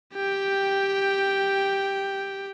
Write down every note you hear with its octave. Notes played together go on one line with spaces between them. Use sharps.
G4 G5